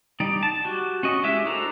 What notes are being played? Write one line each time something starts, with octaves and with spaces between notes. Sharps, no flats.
G3 D#4 D5
A5
F#4 G4
C#4 F#4 D#5
G#3 E4 G4 E5
D4 F#4 A4 C5 A#5